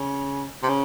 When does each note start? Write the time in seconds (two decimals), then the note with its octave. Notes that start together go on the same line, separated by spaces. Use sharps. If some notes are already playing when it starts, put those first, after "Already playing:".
Already playing: C#3
0.63 C3
0.69 C#3